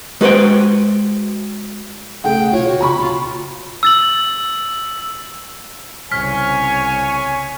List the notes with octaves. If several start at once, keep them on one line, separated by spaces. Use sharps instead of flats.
G#3 F#4 B4 C5 G5
B1 C#3 A3 G#4 F#5 G5
D2 B2 F4 C#5
F#4
C#3 B3 A#5 B5 C#6
C#2 A#2 F4
E6 A6 F#7
C2 C#3 C#5 G#5 F6 B6